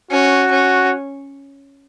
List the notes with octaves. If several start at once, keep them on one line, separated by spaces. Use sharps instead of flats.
C#4 F#4
C#4